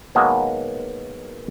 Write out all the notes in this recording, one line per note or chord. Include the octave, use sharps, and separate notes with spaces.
B2 D#3 F#3 G#3 A#3 B3